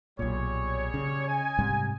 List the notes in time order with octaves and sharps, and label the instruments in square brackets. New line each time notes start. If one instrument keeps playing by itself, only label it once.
[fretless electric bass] B1 A#2 [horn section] G3 G#4 C#5
[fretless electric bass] C#3
[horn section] D#5 G#5
[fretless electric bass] G#2 C3 G3